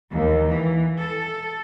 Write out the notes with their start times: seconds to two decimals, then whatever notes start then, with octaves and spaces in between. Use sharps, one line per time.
0.11 D#2
0.48 E3
0.99 A4